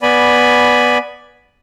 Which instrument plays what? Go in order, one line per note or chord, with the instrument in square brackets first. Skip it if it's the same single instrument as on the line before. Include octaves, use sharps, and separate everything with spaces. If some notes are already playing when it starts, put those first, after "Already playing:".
[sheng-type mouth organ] B3 D5 G#5 B5